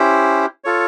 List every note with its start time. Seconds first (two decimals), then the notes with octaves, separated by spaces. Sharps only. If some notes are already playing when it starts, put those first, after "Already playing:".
Already playing: C#4 E4 G4 C5
0.64 F4 A4 C#5